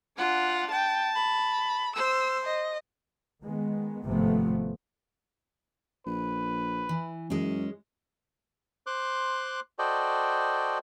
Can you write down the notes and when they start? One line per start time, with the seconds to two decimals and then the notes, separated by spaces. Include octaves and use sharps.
0.18 D4 F4 F#5
0.72 G5 A5
1.15 B5
1.96 C5 E6
2.45 D#5
3.44 D#3 G#3 B3
4.06 G#1 G2 C3 F3 A3 B3
6.06 A#1 B4
6.89 E3
7.30 F#2 G#3 C#4
8.87 C5 C6 D6 F#6
9.79 F#4 A4 C5 D5 D#5 G5